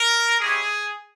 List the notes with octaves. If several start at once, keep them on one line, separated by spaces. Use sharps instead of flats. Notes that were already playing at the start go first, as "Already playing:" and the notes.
Already playing: A#4
G#3 C#4 E4 G4 G#4